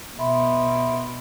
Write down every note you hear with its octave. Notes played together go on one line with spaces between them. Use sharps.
B2 E5 B5 C6